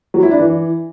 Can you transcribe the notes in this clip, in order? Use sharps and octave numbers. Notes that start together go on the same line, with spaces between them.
F#3
E4
D4
E3